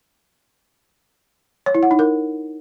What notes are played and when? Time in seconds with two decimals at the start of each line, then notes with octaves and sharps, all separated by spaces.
1.66 C#5
1.74 E4
1.83 F#5
1.91 D#4
1.99 A#4